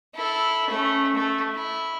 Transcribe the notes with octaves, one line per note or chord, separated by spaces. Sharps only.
E4 A4
A3 C#4
A3
E4